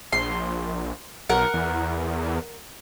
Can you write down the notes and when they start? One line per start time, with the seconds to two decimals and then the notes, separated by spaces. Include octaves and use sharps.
0.13 A#1 C6
1.29 B1 A#4 F#5
1.54 E2